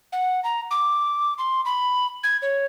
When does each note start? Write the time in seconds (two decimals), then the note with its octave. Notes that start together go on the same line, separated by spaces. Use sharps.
0.12 F#5
0.44 A#5
0.71 D6
1.38 C6
1.65 B5
2.24 G#6
2.42 C#5